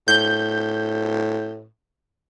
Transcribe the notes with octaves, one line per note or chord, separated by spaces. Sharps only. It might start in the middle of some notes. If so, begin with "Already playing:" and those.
A2 G6